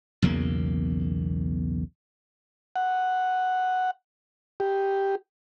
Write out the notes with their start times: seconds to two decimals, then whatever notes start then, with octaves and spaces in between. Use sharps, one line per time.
0.22 B1 E2 C#3 A#3
2.76 F#5
4.60 G4